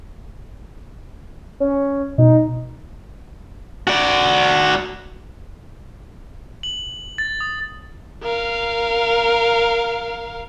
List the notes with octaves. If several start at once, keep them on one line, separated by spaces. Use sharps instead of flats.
C#4
B2 D#4
F#4 D5
F#7
A6
D#6
A#4 F5